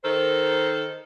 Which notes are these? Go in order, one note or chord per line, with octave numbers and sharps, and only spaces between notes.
D#3 A4 A#4 C5